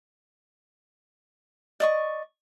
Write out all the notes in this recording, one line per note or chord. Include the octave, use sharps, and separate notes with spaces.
D5 D#5 C#6